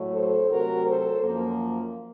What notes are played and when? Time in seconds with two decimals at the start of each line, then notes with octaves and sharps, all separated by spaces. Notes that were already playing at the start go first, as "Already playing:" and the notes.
Already playing: A2 F#3 A3
0.14 A4 C5
0.50 C3 F#3 A3 F#4 A#4
0.86 A4 C5
1.23 F#2 F3 A#3